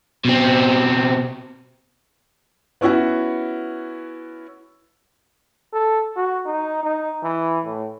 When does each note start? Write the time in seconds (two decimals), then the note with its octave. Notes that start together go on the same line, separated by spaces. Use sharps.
0.25 B2 C4
2.81 B3 C#4 E4 F#4 F#5
5.73 A4
6.16 F#4
6.46 D#4
6.83 D#4
7.23 E3
7.65 A2